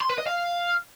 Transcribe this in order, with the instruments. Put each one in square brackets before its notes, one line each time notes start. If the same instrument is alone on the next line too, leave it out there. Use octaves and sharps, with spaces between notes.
[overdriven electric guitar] C6
B4
D#5
F5